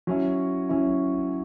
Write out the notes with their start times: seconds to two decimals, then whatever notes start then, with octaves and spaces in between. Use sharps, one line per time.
0.07 F#3 C#4 E4
0.69 F#3 C#4 E4